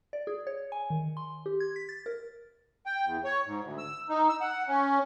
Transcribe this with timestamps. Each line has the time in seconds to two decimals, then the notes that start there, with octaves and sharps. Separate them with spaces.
0.13 D5
0.27 G#4
0.47 C#5
0.72 G#5
0.90 D#3
1.17 C6
1.46 G4
1.60 G#6
1.76 B6
1.89 A6
2.06 A#4
2.86 G5
3.05 E2
3.24 C#5
3.46 G#2
3.64 D2
3.78 E6
4.09 D#4
4.29 E6
4.41 F#5
4.68 C#4